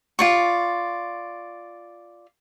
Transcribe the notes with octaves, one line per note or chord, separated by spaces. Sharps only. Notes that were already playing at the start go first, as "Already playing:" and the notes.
F4 D5 C#6